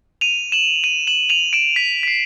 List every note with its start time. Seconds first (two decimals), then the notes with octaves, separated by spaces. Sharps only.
0.21 D#7 F7
0.52 E7 F#7
0.84 D#7 F7
1.07 E7 F#7
1.30 D#7 F7
1.53 D7 E7
1.76 B6
2.03 B6
2.08 C7